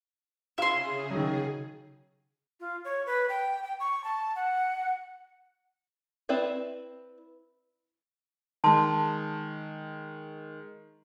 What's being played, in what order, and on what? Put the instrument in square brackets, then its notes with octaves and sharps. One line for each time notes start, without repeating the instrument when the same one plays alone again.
[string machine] C#3 G#4 [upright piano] E4 F4 F5 [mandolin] E5 C6
[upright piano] D#3 F#3
[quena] F4
C#5
B4
G5
G5
C#6
A5
F#5
[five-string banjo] C4 E4 B4 D5 E5
[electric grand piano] D#3 G#3 [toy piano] A5 C6 D#6